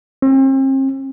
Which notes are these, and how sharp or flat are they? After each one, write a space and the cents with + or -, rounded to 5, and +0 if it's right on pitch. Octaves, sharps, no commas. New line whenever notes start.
C4 +40